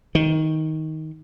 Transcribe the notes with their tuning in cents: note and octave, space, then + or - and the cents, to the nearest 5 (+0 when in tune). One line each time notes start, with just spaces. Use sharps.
D#3 +15